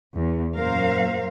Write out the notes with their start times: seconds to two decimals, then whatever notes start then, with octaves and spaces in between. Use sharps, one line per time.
0.16 E2
0.55 F#2 A#2 F#3 A#4 C5 F5